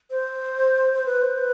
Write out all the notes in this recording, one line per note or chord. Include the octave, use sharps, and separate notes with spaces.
C5
C5
B4
C5
B4